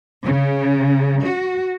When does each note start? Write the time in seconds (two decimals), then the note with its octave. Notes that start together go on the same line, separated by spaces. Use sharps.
0.22 C#3
1.23 F#4